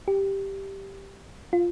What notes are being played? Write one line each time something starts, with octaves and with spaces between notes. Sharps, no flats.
G4
F4